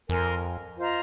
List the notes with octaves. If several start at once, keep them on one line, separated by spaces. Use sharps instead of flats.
F2 A#4 G#5 C6
F4 C5 D#5 A#5